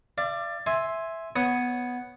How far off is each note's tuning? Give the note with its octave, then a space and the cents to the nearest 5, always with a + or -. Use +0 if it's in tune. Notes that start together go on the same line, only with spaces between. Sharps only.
D5 +15 F5 -45
E5 +0 G#5 +0 C6 +10
B3 +0 C#5 +0 D#6 +0